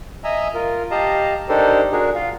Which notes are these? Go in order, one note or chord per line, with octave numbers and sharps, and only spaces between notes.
D#5 E5 G#5 A#5 E6
F4 A#4
G4 D#5 F5 A5 A#5
D4 D#4 G4 A4 A#4 C5
D4 F#4 G#4 A#4
F4 F5